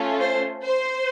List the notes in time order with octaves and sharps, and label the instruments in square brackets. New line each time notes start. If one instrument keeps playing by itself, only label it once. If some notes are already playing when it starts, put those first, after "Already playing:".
Already playing: [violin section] A3 C#4 F4 A4
C5
C5